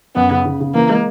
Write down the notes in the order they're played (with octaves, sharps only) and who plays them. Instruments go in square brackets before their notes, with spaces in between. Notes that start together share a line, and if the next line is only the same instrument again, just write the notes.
[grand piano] F#2 [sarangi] B3
[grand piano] C#3
C#3
C#3
[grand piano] E3 [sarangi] A#3
[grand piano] G#3